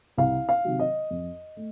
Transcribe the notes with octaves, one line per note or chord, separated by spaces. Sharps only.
C2 F5
F5
C3 D#3 F#3
D#5
F2
A3